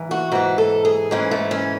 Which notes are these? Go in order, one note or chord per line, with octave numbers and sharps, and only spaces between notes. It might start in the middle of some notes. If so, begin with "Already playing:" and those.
Already playing: G#2 E3
F#4
G#2 E3 F#4
A4
G#4
G#2 E3 C#4
A3
C#4